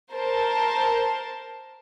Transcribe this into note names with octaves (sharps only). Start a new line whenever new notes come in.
A#4 C5 A5